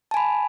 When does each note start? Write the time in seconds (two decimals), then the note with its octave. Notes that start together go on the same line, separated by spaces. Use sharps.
0.11 A5
0.14 G#5
0.17 B5